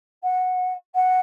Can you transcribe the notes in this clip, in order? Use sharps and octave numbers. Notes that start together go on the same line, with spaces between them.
F#5
F#5